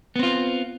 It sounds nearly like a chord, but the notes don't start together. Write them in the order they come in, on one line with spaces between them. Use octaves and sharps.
B3 C4 F4